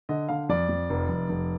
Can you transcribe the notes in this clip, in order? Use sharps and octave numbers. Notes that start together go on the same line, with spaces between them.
D3 D#5
D3 F5
F2 D5
F2
F1
F1
F1